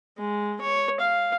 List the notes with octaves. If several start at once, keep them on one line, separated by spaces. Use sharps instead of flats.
G#3
C#5
F5